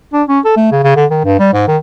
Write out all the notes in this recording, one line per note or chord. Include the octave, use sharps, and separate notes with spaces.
D4
C#4
A4
A3
C#3
C#3
D3
D#3
G2
G3
G#2
D#3